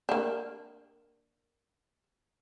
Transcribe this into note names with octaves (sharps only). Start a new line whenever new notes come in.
A#3 D4